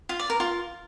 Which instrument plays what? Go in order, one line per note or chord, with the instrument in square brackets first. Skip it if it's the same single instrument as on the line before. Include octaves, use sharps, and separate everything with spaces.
[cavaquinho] F4
D5
A#4
F4